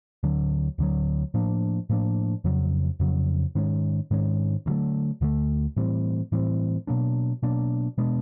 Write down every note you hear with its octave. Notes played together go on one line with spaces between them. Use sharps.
D2 D3 F#3
D2 D3 F#3
A2 F3 A#3 D4
A2 F3 A#3 D4
F2 C#3 F#3
F2 C#3 F#3
G#2 D#3 G#3 C#4
G#2 D#3 G#3 C#4
D2 D3 F#3 A3
D2 D3 F#3 A3
A2 E3 G3 C4
A2 E3 G3 C4
B2 F#3 A#3 D4
B2 F#3 A#3 D4
B2 G#3 B3 D4